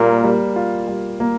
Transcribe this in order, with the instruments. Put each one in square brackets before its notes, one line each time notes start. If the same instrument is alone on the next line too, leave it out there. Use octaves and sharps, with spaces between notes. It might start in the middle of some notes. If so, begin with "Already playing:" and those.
Already playing: [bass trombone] A#2 [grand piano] G3 A#3
[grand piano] G3
F4
G3
A#3